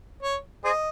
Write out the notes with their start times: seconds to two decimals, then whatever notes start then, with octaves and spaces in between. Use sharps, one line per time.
0.23 C#5
0.65 G#4 C5 D#5